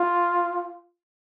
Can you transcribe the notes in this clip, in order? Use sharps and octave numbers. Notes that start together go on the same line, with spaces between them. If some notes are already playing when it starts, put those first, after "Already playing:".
Already playing: F4